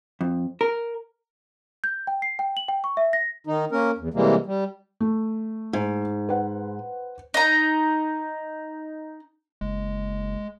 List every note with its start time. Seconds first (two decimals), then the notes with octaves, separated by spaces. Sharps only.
0.21 F2
0.61 A#4
1.84 G6
2.07 G5
2.22 C7
2.39 G5
2.57 F#7
2.69 G5
2.84 C#6
2.97 E5
3.13 A#6
3.47 D#3 D#4
3.72 A#3 C#4 A#4
3.98 E2
4.14 C3 E3 G3 G#3 A#3
4.46 G3
5.00 A3
5.73 G#2
6.29 B4 C5 F#5
7.34 D#4 A#5
9.61 F#1 G#3